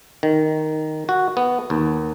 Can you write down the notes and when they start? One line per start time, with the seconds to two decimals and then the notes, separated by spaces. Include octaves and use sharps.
0.23 D#3
1.09 F#4
1.37 B3
1.70 D#2